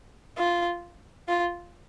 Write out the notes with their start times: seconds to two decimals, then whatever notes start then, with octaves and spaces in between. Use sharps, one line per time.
0.38 F4
1.28 F4